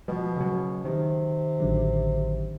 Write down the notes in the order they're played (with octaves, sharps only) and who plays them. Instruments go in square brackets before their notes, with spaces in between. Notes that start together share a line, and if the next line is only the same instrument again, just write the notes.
[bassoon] B2 [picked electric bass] F3 G3
[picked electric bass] C#3 F#3
[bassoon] C3 [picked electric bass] D#3
[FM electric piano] A1 D3 F#3